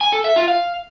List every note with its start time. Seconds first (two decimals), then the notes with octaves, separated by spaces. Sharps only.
0.01 G#5
0.13 A4
0.24 E5
0.36 F4
0.48 F5